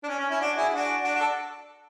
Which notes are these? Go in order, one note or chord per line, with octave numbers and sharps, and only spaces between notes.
D4
C#4
C#4
C#4 E4
D4 F#4
E4 G#4
D4 F#4
D4 F#4
D4 F#4
A4